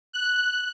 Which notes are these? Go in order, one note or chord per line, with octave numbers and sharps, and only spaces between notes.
F#6